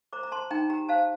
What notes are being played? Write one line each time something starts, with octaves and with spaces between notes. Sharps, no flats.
C5 A#5 D6
A#5
C5 A5 C6
D#4 G5 A#5
G4 G5 A#5
C5 F5 A5